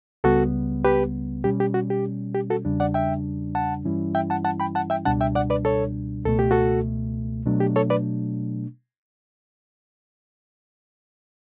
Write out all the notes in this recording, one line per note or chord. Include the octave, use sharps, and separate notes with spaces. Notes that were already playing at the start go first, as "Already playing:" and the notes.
C#2 C#3 G3 B3 F#4 A4
G4 B4
B2 G3 C#4 G4
G4
F#4
G4
G4
F#4 A4
E2 C#3 G3 D4
D5 F#5
E5 G5
F#5 A5
G2 E3 G3 C#4 E4
E5 G5
F#5 A5
F#5 A5
G5 B5
F#5 A5
E5 G5
C#2 B2 G3 D4 F#5 A5
E5 G5
D5 F#5
B4 D5
A4 C#5
C#2 B2 A3 A4
G4
F#4 A4
B2 F#3 A3 D4
G4
A4 C#5
B4 D5